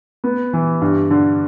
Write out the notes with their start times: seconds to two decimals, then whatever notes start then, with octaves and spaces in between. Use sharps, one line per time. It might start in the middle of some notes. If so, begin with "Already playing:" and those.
0.24 B3
0.53 E3
0.81 G2
1.10 D3